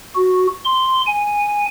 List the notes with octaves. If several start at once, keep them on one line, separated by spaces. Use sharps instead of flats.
F#4
C6
G#5